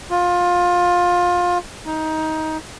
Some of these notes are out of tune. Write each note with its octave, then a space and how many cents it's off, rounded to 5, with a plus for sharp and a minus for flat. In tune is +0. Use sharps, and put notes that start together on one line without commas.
F4 +20
D#4 +15